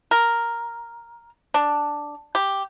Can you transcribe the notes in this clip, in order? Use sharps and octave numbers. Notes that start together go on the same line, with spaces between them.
A#4
D4
G4